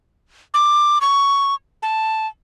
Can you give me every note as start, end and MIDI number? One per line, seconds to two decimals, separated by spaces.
0.54 0.99 86
1.01 1.55 85
1.83 2.27 81